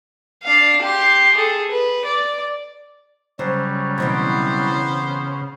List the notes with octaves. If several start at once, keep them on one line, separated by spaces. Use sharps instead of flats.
D4 F5
G4 C6
G#4 A4
B4
D5
C#3 F#3 G3 C5
B2 E3 B3 C4 C5